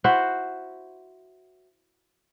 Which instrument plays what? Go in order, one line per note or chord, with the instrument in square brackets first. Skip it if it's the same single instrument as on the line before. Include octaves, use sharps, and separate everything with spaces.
[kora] E4 F#4 C5 F#5